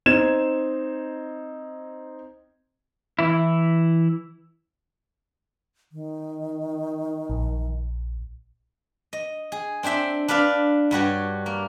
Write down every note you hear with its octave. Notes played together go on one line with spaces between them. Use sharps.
C4 D#4 G#6 E7
E3 E4
D#3
A#1
D#5
G#4
C4 D4 C5 E5 G5
D4 B4 D5 F5 B5
G2 G3 F#4 C#5
A#3